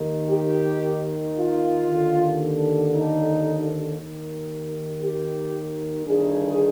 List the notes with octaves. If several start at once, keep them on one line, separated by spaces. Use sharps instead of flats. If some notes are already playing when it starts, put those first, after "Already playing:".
Already playing: D#2 D#3
G4
F4
D#2 D3
D#4
D#2 D#3
G4
G1 G2 D#3 G#4